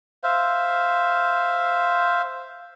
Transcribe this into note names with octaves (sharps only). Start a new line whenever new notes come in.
C5 E5 F5